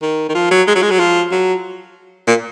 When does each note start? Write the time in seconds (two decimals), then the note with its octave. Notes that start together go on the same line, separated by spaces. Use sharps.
0.02 D#3
0.29 D#3
0.35 F3
0.51 F#3
0.67 G#3
0.75 F#3
0.82 G#3
0.91 F#3
0.99 F3
1.31 F#3
2.27 A#2